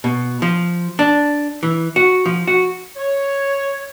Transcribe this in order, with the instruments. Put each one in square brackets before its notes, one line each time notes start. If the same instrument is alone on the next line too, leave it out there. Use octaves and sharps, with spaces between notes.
[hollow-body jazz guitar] B2
F3
D4
E3
F#4
F3
F#4
[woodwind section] C#5